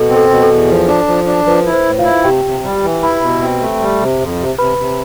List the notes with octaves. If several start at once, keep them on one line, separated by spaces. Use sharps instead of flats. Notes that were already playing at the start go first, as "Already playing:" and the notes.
Already playing: B2 A4
C4
A4
B2
A4
E2
F3
D4
F3
D4
F3 B4
E4
C5
A2
F4 F5
E4
C3 G4 G5
C3
G3
E3
E4 B4 B5
B2
C4
A3
G3
C3
F2
C3
C3 B4 B5
C3